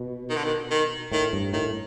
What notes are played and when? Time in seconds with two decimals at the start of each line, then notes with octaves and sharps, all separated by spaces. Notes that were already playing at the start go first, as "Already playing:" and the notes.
Already playing: B2
0.30 D#3
0.36 D3
0.44 D#3
0.71 D#3
1.12 A2 D#3
1.33 G2
1.53 A2 D#3